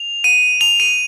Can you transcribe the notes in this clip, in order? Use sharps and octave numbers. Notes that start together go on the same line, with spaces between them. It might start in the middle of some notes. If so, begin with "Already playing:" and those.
Already playing: F7
D#7
F7
D#7